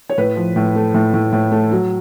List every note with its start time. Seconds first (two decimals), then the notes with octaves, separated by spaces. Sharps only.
0.09 C#5
0.18 A2 B4
0.36 F3
0.56 A2
0.75 A3
0.94 A2
1.14 A2
1.33 A2
1.51 A3
1.71 F#3